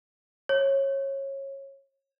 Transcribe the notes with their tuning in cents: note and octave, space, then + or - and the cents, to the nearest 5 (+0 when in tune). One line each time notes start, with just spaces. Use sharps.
C#5 -20